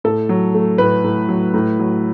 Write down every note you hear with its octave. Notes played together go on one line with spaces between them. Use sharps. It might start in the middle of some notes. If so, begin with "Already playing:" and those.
A2 A4
F#3
A3
A2 B4
A2
F#3
A2
F#3